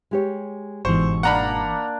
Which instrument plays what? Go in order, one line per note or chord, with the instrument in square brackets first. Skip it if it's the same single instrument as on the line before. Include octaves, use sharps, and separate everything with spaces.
[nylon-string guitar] G#3 G4 C#5
[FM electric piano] G1 E3 [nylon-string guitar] G#2 B2 [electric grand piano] C5 [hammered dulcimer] C#6
[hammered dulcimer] A#3 D4 [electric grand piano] F#5 A#5 B5